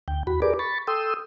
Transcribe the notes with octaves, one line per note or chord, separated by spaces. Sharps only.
D2 G5
E2 F#4 B5
G4 G#4 A#4 B4 D5 D6
B5 C#6 A6
A4 G5 C6 D#6 E6